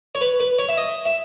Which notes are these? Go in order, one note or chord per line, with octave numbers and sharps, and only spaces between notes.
C#5
B4
B4
C#5
E5
D#5
E5